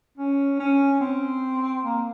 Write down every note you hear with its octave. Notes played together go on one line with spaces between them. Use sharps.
C#4
C#4
C4
A#3